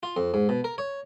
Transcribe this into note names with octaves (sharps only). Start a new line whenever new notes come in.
F4
F2
G#2
B2
A#4
C#5